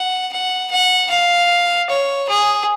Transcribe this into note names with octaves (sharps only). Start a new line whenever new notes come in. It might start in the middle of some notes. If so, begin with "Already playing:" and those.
Already playing: F#5
F#5
F#5
F5
C#5
G#4